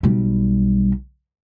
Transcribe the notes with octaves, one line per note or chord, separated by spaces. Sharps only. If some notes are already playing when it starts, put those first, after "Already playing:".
B1 G3